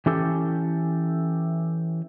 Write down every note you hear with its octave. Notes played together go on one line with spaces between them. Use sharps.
E3 C#4 G4 A4